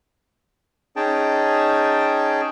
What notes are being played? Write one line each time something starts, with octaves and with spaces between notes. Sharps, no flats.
C#4 D#4 G#4 G5 A5